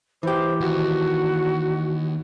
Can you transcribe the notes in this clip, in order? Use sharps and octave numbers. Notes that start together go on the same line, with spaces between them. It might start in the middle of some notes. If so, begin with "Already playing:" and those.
E3 G4 C5
D#2 F#4